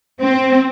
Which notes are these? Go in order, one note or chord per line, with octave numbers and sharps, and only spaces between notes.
C4